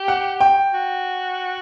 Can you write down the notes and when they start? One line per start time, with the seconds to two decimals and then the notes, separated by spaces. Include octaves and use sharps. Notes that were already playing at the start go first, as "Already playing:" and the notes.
Already playing: G4
0.08 F#5
0.40 G5
0.74 F#4